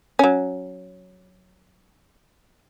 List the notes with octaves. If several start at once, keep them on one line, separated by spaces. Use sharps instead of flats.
F#3 C#4